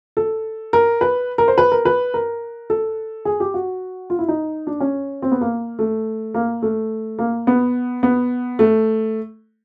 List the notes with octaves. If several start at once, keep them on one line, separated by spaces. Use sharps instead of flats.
A4
A#4
B4
A#4
C5
B4
A#4
B4
A#4
A4
G#4
G4
F#4
F4
E4
D#4
D4
C#4
C4
B3
A#3
A3
A#3
A3
A#3
B3
B3
A3